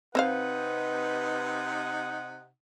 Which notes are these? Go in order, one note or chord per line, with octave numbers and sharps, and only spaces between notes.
C3 C4 D#4 B4 C5 F5 F#5